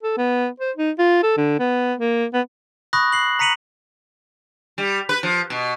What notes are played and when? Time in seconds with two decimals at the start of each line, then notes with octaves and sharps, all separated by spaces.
0.03 A4
0.17 B3
0.60 C5
0.76 D#4
0.99 F4
1.23 A4
1.37 D3
1.60 B3
1.99 A#3
2.34 B3
2.93 B5 C#6 D#6 F#6 A#6
3.12 C7 F#7
3.39 A#5 B6 C#7 D#7 F7 F#7
4.78 G3
5.09 B4
5.23 F3
5.50 B2